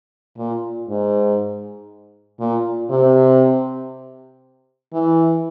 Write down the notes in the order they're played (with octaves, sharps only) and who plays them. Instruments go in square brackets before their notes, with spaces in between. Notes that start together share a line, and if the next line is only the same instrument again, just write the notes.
[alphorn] A#2
G#2
A#2
C3
E3